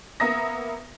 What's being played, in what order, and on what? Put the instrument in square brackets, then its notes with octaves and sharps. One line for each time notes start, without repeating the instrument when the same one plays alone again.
[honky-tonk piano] A#3 B3 E5 A#5 D#6 A#6